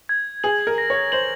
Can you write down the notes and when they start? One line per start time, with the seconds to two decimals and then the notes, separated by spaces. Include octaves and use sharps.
0.09 G#6
0.44 G#4 F#7
0.67 A#4
0.78 A#6
0.90 C#5
1.12 C5 F#7